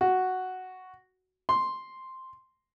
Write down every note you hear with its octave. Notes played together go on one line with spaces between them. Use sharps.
F#4
C6